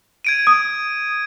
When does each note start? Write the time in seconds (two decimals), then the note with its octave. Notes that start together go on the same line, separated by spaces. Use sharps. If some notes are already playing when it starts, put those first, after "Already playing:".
0.25 G#6 D7 D#7
0.47 D#6